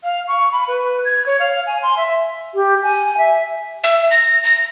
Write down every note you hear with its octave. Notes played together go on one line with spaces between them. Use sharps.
F5
C#6
B5
B4
G#6
C#5
F5
G#5
C6
E5
G4
G#5
E5
E5
A#6
A#6